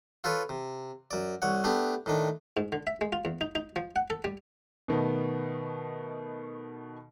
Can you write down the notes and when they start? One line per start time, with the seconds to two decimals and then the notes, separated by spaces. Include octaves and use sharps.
0.24 F4 A4 B4 C#5
0.49 C3
1.11 F#2 D5
1.42 C2 C#5 F#5
1.64 A3 B3 D4 G4
2.06 A2 D#3 D4
2.57 G#2
2.72 D3
2.87 E5
3.01 G#3
3.13 F4
3.25 E2
3.41 D#4
3.55 D#4
3.76 F3
3.96 F#5
4.10 A4
4.24 G3
4.88 B2 D#3 A3 B3